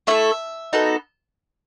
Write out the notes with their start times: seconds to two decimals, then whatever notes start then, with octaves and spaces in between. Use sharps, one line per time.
0.07 A3 E4 A4 E5
0.73 B3 D#4 F#4 A4